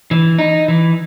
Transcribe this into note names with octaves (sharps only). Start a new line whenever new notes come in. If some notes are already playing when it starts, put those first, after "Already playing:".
E3
D#4
E3